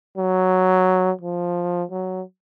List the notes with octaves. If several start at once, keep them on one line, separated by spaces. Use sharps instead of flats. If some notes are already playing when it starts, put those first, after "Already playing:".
F#3
F3
F#3